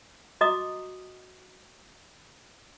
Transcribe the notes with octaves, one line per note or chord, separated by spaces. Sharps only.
F#4 D#5 A#5 D6 D#6